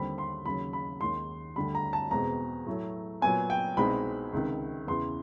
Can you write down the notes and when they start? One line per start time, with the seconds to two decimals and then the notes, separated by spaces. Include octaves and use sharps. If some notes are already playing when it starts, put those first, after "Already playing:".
Already playing: D#2 D3 G3 C4 B5
0.18 C6
0.46 D#2 C#3 F#3 B5
0.73 B5
1.01 D#2 D#3 G#3 C#4 C6
1.56 D2 D3 G3 B5
1.75 A#5
1.93 A5
2.11 E2 B2 G#3 C4 A#5
2.67 A2 F#3 A3
3.22 A#2 F#3 B3 G#5
3.50 G5
3.77 C2 B2 G#3 C4 D#4 B5
4.33 C#2 C3 D#3
4.87 E2 C#3 E3 C6